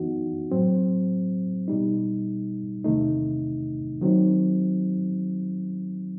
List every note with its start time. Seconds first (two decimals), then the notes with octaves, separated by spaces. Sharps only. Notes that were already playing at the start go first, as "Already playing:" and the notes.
Already playing: F#2 E3 B3 D#4 F#4
0.51 A2 F#3 C4
1.68 B2 G3 D#4
2.84 E2 C3 D#3 A3 D#4
4.02 D#3 F#3 C4 D#4